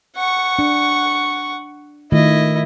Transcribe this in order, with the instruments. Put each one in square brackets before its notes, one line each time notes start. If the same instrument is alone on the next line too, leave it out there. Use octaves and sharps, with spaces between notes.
[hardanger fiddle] F#5 C#6
[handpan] D4
[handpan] D#3 A3 F4 [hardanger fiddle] E4 D#5